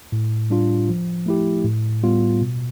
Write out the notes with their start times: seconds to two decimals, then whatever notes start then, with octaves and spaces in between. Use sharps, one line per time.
0.12 A2
0.50 G3 D4 F4
0.89 F3
1.26 A3 E4 G4
1.64 A2
2.03 G3 B3 F4
2.42 B2